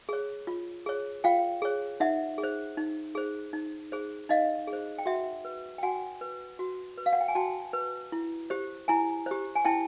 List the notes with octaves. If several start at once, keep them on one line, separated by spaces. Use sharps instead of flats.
G#4 C#5
F4
G#4 C#5
F4 F5 G5
G#4 C#5
D#4 E5 F#5
G#4
C5
D#4
G#4 C5
D#4
G#4 C5
D#4 D#5 F5
G#4
C5
G5
F#4 E5 F#5
B4
G5
F#4 F#5 G#5
B4
F#4
B4
F5
F#5
G5
G#5
F#4 G5 A5
B4
E4
G4 C5
E4 G#5 A#5
G4 C5
G#5
E4 G5 A5